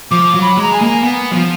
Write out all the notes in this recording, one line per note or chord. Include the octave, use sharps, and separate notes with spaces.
F3 D6
F#3
B5
G#3 A#5
G#5
A#3
B3
F#3
F3